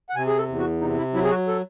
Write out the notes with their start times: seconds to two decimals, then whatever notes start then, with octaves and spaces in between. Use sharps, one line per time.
0.09 F#5
0.15 C3 G#5
0.27 G#4
0.38 A4
0.48 E2
0.59 F#4
0.81 C3 D#4
0.97 E4
1.14 F#3 E4
1.23 G#4
1.30 F#4
1.48 A4